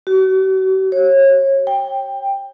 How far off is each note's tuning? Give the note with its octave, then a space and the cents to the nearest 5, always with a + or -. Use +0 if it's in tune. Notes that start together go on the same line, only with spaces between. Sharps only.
F#4 +45
C#5 -30
G5 +10